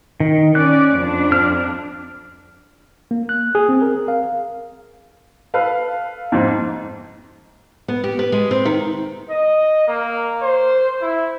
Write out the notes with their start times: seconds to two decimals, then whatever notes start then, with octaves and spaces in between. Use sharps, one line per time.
0.20 D#3
0.55 C#4 D5 F#6
0.97 F2 D4
1.32 F6
3.11 A#3
3.29 F#6
3.55 G#4
3.69 C4
3.82 A#4
4.08 F5
5.54 A4 B4 F5
6.32 F2 G#2
7.88 B3
8.04 G4
8.19 B4
8.32 G#3
8.51 C4
8.65 D#3
9.30 D#5
9.88 A#3
10.42 C5
11.02 E4